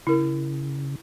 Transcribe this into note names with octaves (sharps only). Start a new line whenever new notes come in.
C#3 E4 A#4